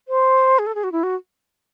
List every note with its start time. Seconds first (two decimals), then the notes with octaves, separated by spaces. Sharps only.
0.08 C5
0.59 G#4
0.66 A4
0.75 G#4
0.84 F#4
0.92 E4
1.03 F#4